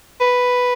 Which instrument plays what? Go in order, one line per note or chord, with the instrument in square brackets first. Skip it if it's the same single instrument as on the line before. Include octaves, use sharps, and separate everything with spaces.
[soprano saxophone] B4